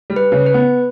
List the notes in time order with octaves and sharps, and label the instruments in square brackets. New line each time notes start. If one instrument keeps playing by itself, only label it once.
[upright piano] G3
[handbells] B4
[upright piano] C#3
[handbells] B4
[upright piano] B3